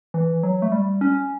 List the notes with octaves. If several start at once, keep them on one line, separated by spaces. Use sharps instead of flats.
E3
F#3
A3
G3
C#4